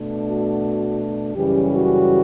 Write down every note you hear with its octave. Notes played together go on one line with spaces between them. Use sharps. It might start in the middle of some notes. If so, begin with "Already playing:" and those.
Already playing: B2 A3 D4
F#4
F#2 C#3 E3 G3 C#4 G4
F#4